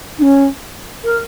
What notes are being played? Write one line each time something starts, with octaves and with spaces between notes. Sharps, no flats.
D#4
C#4
A#4